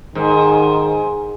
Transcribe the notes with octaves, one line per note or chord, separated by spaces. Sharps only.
G#2 D#3